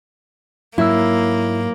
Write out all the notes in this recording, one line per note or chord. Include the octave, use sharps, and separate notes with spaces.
G#2 F#3 A#3 E4 B5 E6